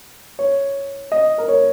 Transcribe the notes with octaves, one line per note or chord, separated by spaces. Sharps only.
C#5
D#5
A#4
C#5